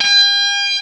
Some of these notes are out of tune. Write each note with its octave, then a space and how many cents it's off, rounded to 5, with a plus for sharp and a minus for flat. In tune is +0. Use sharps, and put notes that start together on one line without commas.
G5 +45